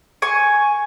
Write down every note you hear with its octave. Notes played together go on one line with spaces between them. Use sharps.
G#5 C#6